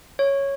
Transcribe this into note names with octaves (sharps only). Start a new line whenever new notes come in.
C#5